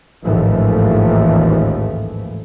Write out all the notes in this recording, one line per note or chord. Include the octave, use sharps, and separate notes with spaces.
A1 D#2 G#2 E3 F3 A3